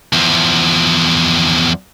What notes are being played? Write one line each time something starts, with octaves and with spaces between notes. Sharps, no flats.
E2 F3